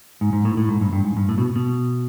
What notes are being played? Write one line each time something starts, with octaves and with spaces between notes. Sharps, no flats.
G#2
G#2
A2
A2
G#2
G2
G2
G#2
G2
A2
B2
B2